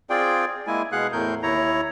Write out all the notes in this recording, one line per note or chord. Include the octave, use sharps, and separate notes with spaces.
C4 F4 G#4 D5 G5
G#3 A#3 E4 G#5
B2 G#3 G#4 F5 F#5 F#6
E2 A2 A3 A#4 G6
D#2 E4 C#5 A#5